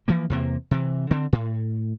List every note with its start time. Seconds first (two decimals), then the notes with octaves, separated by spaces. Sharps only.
0.08 E3 F3 A#3
0.30 E2 C3 A#3
0.71 C3 E3
1.11 D3 C4
1.33 A2